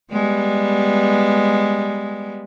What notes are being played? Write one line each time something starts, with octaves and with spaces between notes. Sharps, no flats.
G3 G#3 B3